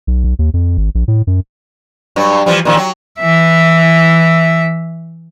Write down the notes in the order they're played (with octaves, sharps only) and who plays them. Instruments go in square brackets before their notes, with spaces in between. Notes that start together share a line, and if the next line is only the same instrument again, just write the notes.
[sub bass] B1
B1
D#2
F2
G#1
A#1
A2
F#2
[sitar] G2 F#3
E3 F3 G3
A#2 D#3 F3
F#3
[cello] E3 E5